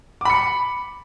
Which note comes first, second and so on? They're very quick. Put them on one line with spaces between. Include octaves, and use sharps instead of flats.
D6 B5 C#7